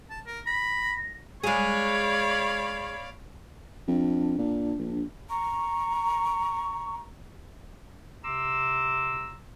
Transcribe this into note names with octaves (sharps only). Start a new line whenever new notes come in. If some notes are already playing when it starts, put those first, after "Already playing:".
A5
A#4
B5 A#6
G#3 G#4 C#5 D5 F5 B5
F2 D4
A#2
A#1
A#5 C#6
C3 A#5 C6 D6 E6